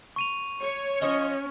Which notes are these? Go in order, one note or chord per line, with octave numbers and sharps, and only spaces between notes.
C#6 D#7 F7
C#5
F3 C#4 D#5